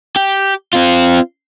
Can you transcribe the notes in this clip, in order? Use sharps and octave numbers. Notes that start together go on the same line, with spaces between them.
G4
C4 F4